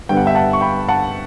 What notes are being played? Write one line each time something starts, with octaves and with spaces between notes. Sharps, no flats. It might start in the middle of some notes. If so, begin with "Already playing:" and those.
G2 D3 G3 B3 G5
F#5
E5 G5
F#5 A5
C#6
G5 B5
F#5 A5